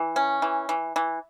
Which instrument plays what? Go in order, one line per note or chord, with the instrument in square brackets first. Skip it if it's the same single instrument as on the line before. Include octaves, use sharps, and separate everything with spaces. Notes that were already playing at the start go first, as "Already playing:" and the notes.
Already playing: [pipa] E3
C#4
E3
E3
E3